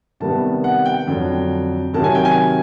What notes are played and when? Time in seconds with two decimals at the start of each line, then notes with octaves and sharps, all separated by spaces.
0.20 C3 D#3 G3 B3 A5
0.64 F#5
0.85 G5
1.07 F2 D3 F#3
1.94 C3 D#3 F#3 A5
2.04 G#5
2.15 G5
2.25 G#5